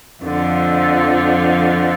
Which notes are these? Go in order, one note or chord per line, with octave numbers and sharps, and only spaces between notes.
F2 D3 F3